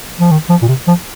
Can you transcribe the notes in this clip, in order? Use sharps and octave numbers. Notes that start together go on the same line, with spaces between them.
F3
D#3
F3
A#2
C3
F3